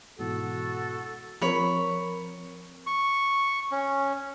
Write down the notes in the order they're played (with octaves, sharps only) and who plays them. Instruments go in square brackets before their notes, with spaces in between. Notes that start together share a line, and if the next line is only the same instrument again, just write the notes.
[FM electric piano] G#2 B2 E3 [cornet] F#4 [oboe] A4
[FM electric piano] F3 C4 A#4 [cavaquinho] C#5 B5
[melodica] C#6
C#4